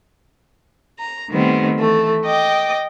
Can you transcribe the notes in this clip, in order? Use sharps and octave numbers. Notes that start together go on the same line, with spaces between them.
A#5
D#3 G3 A3 B3 C4
E3 A3
D#5 G5 D6